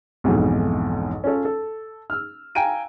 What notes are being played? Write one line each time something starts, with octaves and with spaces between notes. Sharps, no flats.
B1 F2 G#2 B2 E3
C#4 F4 A4 C#5
A4
E6 F6
F5 G5 G#5 A#5 D7 D#7